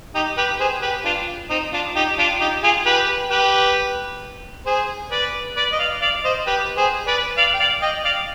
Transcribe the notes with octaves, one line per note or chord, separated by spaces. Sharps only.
D#4 G4
G4 B4
G#4 C5
G4 B4
D4 F4
C4 D#4
D4 F4
D#4 G4
D4 F4
D#4 G4
F4 G#4
G4 B4
G4 B4
G#4 C5
B4 D5
B4 D5
D#5
D5 F5
D5 F5
C5 D#5
G4 B4
G#4 C5
B4 D5
D5 F5
G5
D5 F5
D#5 G5
D5 F5